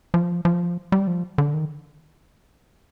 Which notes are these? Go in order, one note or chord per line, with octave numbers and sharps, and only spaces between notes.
F3
F3
G3
F3
D3
D#3